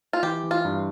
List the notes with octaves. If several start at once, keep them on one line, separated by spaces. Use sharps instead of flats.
F4
E3 G4
E3
F4
G2